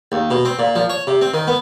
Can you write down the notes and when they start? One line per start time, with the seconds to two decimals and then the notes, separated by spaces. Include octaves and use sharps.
0.12 D#2
0.31 B2
0.45 C4
0.59 A#2
0.76 F3
0.89 C#5
1.07 C3
1.21 C4
1.34 D#3
1.47 B3